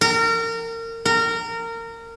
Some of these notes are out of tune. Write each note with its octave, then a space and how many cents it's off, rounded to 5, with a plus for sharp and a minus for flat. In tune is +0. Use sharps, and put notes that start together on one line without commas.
A#4 -30
A#4 -25